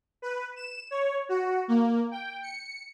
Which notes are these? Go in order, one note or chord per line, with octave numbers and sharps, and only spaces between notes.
B4
E7
C#5
F#4
A#3
G5
C#7